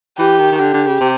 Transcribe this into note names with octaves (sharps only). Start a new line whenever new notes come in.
E3 G4
D#3
D#3
D3 G4
D3
C#3
C3